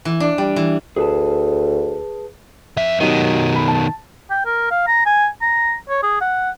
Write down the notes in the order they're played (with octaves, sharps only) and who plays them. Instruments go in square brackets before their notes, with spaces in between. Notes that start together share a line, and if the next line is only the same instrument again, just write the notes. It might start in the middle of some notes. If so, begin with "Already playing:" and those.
[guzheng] E3
D4
G3
E3
[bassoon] D2 [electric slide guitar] G#4 B4 A5
[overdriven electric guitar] F2 E5
[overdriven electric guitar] B2 D#3 [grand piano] F#3 D#4 G4
[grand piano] B5
A5
[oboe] G5
A#4
F5
A#5
G#5
A#5
C#5
G#4
F#5